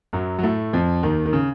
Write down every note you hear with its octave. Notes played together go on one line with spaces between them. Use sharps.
F#2 F#3
F#3
A2 A3
F2 F3
D#2 D#3
D#3
C#3